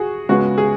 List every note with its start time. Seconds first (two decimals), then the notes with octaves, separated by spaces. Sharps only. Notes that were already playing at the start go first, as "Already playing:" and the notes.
Already playing: F#4 G#4
0.29 C#2 C#3 G#3 B3 F#4
0.58 G#4